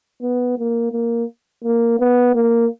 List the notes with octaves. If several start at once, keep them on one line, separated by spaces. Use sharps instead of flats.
B3
A#3
A#3
A#3
B3
A#3